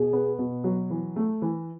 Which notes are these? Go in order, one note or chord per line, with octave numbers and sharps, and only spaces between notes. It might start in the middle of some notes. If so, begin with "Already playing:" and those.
Already playing: B2 G#4
B3
B2
F#3
E3
A3
E3